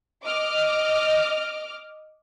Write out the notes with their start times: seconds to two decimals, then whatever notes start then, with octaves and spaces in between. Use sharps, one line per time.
0.24 D#5 D6 F6